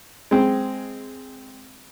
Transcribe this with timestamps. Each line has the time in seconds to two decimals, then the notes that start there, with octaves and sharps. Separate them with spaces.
0.31 G#3 C4